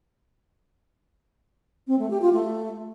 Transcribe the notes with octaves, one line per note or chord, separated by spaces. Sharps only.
C4
A3
G4
F4
A3